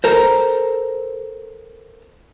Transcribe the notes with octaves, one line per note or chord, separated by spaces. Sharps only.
A4 A#4 C5